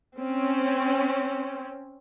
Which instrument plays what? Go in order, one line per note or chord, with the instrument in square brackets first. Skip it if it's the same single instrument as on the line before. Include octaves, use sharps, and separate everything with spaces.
[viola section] C4 C#4